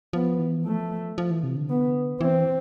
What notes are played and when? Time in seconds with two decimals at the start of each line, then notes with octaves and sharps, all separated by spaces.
0.13 F3 B3
0.39 E3
0.65 F3 A3
1.18 F3
1.30 E3
1.43 C3
1.56 D3
1.70 B3
2.21 E3 C4